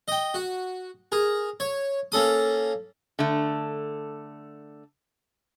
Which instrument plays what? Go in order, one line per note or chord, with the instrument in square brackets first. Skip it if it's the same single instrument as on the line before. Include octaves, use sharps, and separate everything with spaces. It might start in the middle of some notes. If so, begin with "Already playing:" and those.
[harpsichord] D#5 G5
F#4
G#4 A#4
C#5
A#3 C#4 A4 D#6
[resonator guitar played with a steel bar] D3 A3